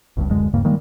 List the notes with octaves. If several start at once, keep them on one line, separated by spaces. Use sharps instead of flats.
G1 C#2 G2
D1 F#2 D3 G#3
D#1 G2 C#3 A#3
D#3 G3 G#3 A#3